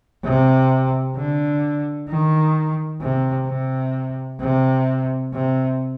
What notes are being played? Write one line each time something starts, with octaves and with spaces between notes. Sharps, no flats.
C3
D3
D#3
C3
C3
C3
C3